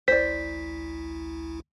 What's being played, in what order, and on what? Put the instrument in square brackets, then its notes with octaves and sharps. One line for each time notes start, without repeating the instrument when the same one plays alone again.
[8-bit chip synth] A1 D2 E4 [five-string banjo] C5 D5 [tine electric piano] B6